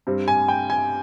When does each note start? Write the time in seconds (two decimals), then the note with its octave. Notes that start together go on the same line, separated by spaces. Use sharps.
0.07 G2 G3 C4
0.28 G#5
0.48 G5
0.70 G#5